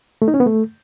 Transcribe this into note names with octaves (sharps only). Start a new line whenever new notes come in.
A3
D#4
C#4
B3
A3